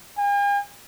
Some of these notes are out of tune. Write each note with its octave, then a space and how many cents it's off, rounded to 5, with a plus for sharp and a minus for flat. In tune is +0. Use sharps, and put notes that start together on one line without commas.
G#5 -45